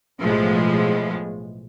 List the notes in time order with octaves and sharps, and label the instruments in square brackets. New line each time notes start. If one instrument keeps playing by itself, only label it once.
[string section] B1 A2 F3 G#3